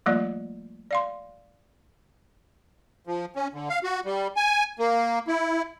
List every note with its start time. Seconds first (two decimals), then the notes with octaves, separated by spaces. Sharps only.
0.06 F3 G3 A3 A#3 F4 D5
0.91 D5 F5 C6
3.07 F3
3.36 C#4
3.54 D3
3.69 F5
3.84 F#4
4.05 G3
4.36 G#5
4.79 A#3
5.28 E4